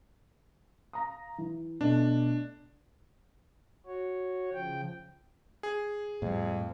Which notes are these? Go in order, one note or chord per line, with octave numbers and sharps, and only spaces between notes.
F5 A#5 D#6
E3
B2 A3 D4
F#4 C#5
C#3 F3 G5
G#4
F2 A2 G3